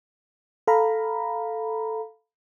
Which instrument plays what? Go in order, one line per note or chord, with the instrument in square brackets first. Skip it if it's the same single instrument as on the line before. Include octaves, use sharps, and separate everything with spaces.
[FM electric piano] A4 F5 A#5 B5